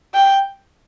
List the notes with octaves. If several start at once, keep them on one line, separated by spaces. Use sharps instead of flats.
G5